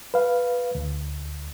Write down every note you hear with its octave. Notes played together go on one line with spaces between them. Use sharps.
B4 F5
D2